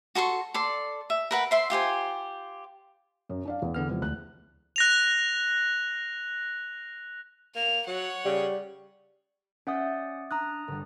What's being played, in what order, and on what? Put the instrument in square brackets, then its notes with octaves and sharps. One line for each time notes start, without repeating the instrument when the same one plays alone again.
[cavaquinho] F#4 A4 C6 C#6
A4 D5 C6
E5
A#4 B4 F#5
C5 E5 C6
F4 G4 C5 G#5
[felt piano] F#2
D4 D5 F5
E2
[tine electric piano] D3 B3 F6
C3 F3 G#3
[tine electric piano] D2 [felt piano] F#6
[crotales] F#6 A#6 F7
[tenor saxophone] A#3 [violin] F7
[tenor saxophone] F#3 [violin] C#5 F#5
[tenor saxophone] C#3 [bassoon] G3
[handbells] C#4 F#5 D#6 [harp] D5 E5 G6
[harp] D4 [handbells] A#5 D#6 F#6
[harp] G1 G3